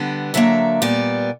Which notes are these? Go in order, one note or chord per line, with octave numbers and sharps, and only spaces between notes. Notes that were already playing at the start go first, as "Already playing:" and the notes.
Already playing: D3 G3 B3
D3 F#3 A#3 E5
A#2 G3 B3 D5